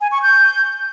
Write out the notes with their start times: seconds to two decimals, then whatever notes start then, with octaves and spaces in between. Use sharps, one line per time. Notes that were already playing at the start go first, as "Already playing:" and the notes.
0.01 G#5
0.12 C#6
0.23 G6